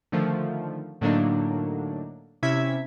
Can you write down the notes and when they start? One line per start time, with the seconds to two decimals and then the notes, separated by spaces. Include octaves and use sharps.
0.12 D3 D#3 F3 A3
1.01 A2 D3 F#3 A#3 D4 D#4
2.43 C3 C#4 E4 E5 G#6 B6